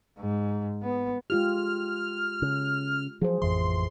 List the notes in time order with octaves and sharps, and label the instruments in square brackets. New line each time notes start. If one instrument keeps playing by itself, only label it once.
[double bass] G#2
B3
[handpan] G#3 F4 G4 [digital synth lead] F6
[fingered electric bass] C#3
[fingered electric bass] F3 F#3 [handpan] G#4 C5
[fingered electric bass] A1 F2 E3 [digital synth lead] C6